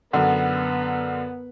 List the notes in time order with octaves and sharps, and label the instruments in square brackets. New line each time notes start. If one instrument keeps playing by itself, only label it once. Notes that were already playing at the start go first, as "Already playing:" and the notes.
[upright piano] F#2 D3 [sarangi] B3 [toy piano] F#5